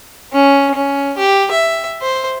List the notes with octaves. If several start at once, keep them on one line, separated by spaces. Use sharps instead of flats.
C#4
C#4
G4
E5
C5